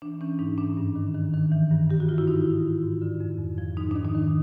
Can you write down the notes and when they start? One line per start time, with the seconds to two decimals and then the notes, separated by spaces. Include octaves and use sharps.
0.02 E3 D4
0.21 E3 C#4
0.39 G#2 D#4
0.58 E3 D4
0.77 G2
0.96 D#3
1.14 D#3
1.34 D#3
1.52 E3
1.71 G2
1.89 G2 G4
2.00 F#4
2.09 G2 F4
2.18 E4
2.27 G#2 D#4
2.45 G#2
2.64 G#2
2.83 G#2
3.02 D3
3.20 F2
3.39 F2
3.58 F3
3.77 G#2 D#4
3.91 D#3 D4
4.05 D#4
4.15 D#3